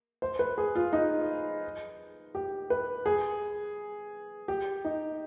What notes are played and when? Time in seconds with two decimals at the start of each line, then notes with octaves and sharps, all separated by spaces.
0.22 C5
0.39 B4
0.58 G#4
0.75 F4
0.93 D#4
2.35 G4
2.70 B4
3.06 G#4
4.48 G4
4.85 D#4